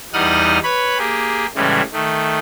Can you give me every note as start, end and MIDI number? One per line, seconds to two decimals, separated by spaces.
0.13 0.59 40
0.13 0.59 55
0.13 0.59 63
0.13 0.59 78
0.13 0.59 87
0.13 0.59 89
0.63 0.98 71
0.63 0.98 73
0.63 0.98 83
0.98 1.46 58
0.98 1.46 67
0.98 1.46 68
1.55 1.82 45
1.55 1.82 49
1.55 1.82 52
1.55 1.82 55
1.55 1.82 56
1.92 2.39 51
1.92 2.39 57